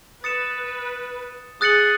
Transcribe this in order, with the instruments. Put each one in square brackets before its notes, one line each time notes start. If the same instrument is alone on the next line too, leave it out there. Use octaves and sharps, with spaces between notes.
[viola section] B4 [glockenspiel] D#6 A6 C#7 E7
[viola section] G#4 [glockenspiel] D#6 F#6 A6 C#7 F#7